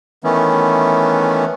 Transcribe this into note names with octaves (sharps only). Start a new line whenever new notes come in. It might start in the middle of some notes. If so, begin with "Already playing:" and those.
D#3 E3 A3 B3 C#4